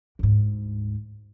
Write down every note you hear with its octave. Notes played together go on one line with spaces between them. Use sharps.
D2 G#2